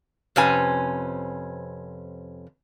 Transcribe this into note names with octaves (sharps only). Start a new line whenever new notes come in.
F2 C3 C#4 B4 G#5